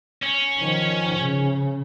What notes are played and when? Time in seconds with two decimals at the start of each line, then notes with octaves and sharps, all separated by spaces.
0.23 C#4
0.58 D#3 F3
1.18 C#3